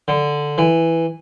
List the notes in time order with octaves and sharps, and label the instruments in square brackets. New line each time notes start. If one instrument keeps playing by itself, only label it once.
[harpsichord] D3
E3